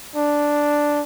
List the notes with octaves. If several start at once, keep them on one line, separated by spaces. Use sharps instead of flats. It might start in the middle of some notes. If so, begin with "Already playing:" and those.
D4